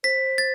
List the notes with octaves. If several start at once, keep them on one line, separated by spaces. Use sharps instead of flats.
C5 B6
A6